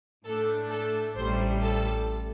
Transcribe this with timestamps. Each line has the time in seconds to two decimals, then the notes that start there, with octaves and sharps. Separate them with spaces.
0.25 A2 A3 D4 A4
0.70 A4
1.15 A1 A2 G3 C5
1.61 A4